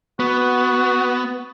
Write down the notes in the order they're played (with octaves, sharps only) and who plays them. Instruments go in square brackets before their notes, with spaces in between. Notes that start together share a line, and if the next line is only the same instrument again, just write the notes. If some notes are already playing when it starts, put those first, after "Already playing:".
[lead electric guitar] B3 [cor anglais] F#4